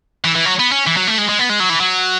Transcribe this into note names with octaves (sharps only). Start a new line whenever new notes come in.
E3
E3
F#3
B3
C#4
E3
F#3
A3
G#3
G#3
B3
G#3
F#3
E3
F#3